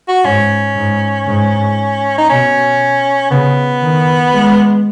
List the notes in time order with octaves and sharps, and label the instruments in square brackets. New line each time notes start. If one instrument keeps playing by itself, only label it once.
[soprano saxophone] F#4
[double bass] G#2 [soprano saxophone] C#4
[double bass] G#2
G#2
[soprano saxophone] D#4
[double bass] B2 [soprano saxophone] C#4
[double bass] C#3 [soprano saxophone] B3
[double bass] D#3
G#3